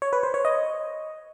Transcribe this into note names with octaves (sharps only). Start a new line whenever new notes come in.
C#5
B4
C5
C#5
D#5